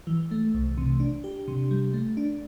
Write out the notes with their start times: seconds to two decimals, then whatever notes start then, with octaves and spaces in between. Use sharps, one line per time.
0.07 E3
0.31 A3
0.54 C2
0.77 C3
1.00 D4
1.24 G4
1.48 C3
1.71 G3
1.94 A3
2.17 D4